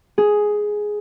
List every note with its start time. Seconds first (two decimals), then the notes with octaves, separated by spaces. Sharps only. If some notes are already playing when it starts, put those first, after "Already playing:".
0.18 G#4